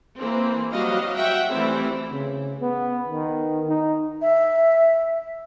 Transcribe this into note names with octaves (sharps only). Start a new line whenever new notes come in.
E3 A#3 C4
F#3 G3 F#4 D#5 F5
F#4 E5 F#5 G5
E3 G3 A3 C4 E4
C#3
B3
D#3
D#4
E5